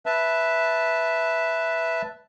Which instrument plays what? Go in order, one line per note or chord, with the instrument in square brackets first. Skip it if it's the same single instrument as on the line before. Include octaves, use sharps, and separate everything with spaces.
[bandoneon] B4 E5 A5